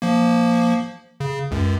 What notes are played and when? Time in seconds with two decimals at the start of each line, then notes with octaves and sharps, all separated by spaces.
0.02 F3 A#3
1.20 C#3
1.51 C#2 F#2